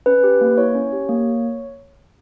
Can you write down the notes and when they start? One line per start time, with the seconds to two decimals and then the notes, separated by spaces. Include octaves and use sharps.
0.06 C#4 B4
0.24 G4
0.41 A#3
0.58 E4 C#5
0.75 C#4
0.93 G4
1.09 A#3